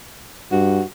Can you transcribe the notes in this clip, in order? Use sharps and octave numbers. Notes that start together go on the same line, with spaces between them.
G2 F#4